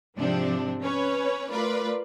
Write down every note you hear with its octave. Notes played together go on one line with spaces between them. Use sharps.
G#2 C3 F3 C4 D4
C#4 B4 C#5
A3 F4 A#4 B4 D5